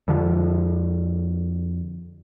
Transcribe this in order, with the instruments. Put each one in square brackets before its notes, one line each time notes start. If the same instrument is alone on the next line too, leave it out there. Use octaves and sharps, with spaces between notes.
[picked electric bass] F2 D3 F3